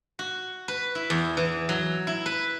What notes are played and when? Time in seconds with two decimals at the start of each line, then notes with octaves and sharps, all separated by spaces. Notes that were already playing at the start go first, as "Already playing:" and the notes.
0.19 F#4
0.68 B4
0.95 E4
1.10 E2
1.37 E3
1.69 F#3
2.07 E4
2.26 B4